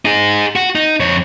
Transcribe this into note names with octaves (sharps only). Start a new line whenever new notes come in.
D#4 G#4
F#4
D#4
F2 C#5